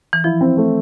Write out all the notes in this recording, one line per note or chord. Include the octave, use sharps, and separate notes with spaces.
E3
F3 E4
C4
A3